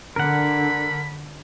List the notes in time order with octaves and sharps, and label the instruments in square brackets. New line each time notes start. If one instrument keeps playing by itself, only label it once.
[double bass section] D3 [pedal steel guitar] A#4 F#5 [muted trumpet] B5